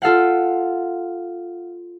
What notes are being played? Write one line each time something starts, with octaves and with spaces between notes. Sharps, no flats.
F4 A4 F5 F#5